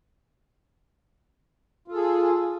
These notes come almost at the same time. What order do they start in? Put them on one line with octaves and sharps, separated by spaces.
F4 A4 G#4